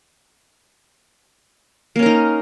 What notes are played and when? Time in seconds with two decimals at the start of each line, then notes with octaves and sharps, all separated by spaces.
1.96 A#3
1.99 C#4
2.02 A#4
2.06 D#4